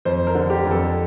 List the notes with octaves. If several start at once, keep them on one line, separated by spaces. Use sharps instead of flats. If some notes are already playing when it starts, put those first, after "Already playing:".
F2 C5
A#4
D3
G4
F2
A4